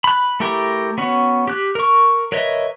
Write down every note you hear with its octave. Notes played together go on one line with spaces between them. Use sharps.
B5 F#6
A3 E4 G4 A#4 G5
B3 C#4 F#4
G4 F#6
A#4 C#6
A#4 B4 C#5 D#5 E5